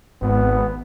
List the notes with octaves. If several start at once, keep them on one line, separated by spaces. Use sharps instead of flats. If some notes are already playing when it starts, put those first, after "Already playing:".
G#1 B3